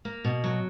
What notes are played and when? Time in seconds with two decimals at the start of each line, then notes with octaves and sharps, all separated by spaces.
0.05 A#3
0.25 B2
0.44 F#3